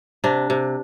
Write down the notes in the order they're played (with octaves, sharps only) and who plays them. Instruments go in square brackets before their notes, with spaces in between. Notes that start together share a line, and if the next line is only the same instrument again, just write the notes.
[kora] C3 D4
C3